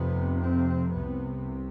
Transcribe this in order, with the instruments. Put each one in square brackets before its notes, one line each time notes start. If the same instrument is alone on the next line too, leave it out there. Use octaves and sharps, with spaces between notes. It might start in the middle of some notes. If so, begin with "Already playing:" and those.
Already playing: [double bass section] F1 F2 C3 B3
C4
C2 C3 B3